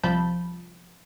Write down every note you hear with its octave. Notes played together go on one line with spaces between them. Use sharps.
C2 C3 F3 A5 B5 G6